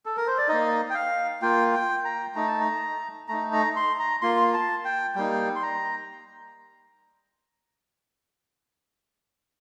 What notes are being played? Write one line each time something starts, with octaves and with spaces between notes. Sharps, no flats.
A4
A#4
C5
D5
A#3 D#4 D#5
G5
F5
A#3 F4 G5
G5
A#5
A3 D#4 A#5
A5
A#5
A3 D#4 A#5
A#5
C6
A#5
A#3 F4 C6
A5
G5
G3 A#3 D#4 G5
C6
A#5